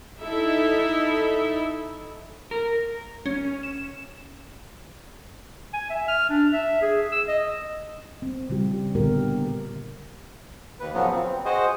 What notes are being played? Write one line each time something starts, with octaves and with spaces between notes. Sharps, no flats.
D#4 E4 A4 E5
A#4
C#4
E7
G#5
E5
F6
D4
E5
G#4
E6
D#5
C4
C#3 G3 F4 G4
A#2 D3 B3 G4 A#4
D#2 B4
A#2 C#3 F3 F#3 B3
C4
F#4 G#4 C5 D#5